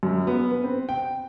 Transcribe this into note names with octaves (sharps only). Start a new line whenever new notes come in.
F#2
B3
B4
C4
G5